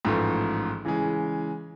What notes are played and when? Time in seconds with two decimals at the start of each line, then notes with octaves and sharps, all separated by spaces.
0.05 A1 G#2 F3 A3
0.85 C#3 E3 G#3